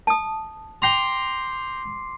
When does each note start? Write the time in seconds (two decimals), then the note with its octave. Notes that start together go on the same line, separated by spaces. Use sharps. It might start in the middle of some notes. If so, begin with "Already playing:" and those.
0.07 A5 D#6
0.82 G5 A#5 C6 D6 C7